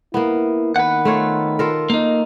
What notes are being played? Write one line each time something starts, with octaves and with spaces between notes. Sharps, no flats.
A#3 B3 E4
D#3 B4 F#5
A3 F4 C#5
F4 A4 A#4
A#3 D#4